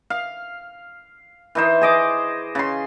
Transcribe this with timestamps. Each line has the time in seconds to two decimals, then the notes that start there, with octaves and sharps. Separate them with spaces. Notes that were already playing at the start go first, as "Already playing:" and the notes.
0.10 F5
1.55 E3 D#4 C5
1.81 G#4 D#5 D6
2.55 C#3 C6